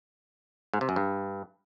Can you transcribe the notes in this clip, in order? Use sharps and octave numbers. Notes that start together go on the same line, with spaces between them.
G#2
C3
F#2
G2